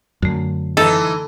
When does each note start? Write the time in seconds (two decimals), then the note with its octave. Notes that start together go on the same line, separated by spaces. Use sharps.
0.22 F#2 D3 A3
0.77 E3 D#4 A4